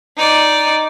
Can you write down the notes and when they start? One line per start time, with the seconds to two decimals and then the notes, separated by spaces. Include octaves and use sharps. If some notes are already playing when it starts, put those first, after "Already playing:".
0.17 D#4 D5